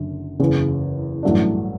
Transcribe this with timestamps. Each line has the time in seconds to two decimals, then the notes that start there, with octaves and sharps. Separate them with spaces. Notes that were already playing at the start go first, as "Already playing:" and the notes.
Already playing: F#1 F#2 D3
0.40 F#1 E2 C#3
1.23 A1 G2 F#3 A3 D4